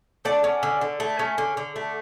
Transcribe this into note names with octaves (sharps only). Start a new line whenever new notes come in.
A3 D5 F#5
C#4
D3
D3
A3
C#4
D3
D3
A3